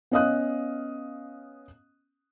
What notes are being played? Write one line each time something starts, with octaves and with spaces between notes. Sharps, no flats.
B3 C#4 D#5 F5 D#6 F#6